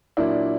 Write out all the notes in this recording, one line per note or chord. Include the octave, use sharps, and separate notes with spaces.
A#2 F#3 A#3 D4 E4